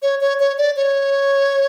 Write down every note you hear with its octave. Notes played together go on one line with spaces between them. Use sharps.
C#5
C#5
C#5
D5
C#5